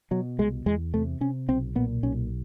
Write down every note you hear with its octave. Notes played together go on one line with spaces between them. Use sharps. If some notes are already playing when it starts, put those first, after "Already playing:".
B2 F#3
C2 G#3
E2 G#3
C3 A3
C3 C#4
B1 C4
A#2 B3
B1 C#4